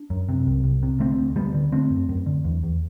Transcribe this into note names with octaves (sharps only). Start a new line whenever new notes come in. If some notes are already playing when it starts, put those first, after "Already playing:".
Already playing: D4
F#2
C3
C2
C2
C3
D3 A3 C4
D2
D2 G3 B3
D3
D3 A3 C4
F#2
F#2
D3
E2
E2